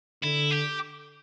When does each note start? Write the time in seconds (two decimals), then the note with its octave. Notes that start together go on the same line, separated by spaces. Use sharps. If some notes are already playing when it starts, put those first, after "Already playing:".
0.22 D3 E4
0.51 G4